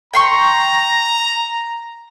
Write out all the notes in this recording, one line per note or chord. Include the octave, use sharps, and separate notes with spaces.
G5 A#5 C6 C#6